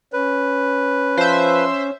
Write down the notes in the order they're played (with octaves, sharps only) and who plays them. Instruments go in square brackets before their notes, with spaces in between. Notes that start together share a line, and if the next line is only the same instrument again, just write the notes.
[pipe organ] C#4 [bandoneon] B4
[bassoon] F3 [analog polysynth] C5 E5